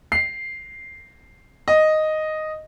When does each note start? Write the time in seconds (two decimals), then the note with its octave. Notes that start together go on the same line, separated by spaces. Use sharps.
0.12 C7
1.68 D#5